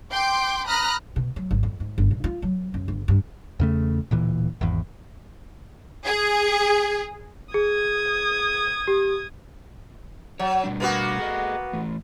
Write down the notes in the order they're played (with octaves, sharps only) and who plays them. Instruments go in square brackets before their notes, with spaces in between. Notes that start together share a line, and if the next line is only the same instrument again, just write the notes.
[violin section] G5 C6 D6 G6
A#5 B5 D#6 F6 F#6 A#6
[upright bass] B2
F#3
G#1
F2
G#2
G1
A#2
F4
F#3
F#2
G1
G2
[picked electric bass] E2 C#3 A3
D1 A#2 E3
G#1 E2
[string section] G#4
[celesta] G#4 [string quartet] D#6 G#6
[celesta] G4
[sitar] F#3 [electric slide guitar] C#5
[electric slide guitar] B2 G3 D4
[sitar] A#3 B3 F#4
[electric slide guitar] G#4 A4 D#5
E3 A3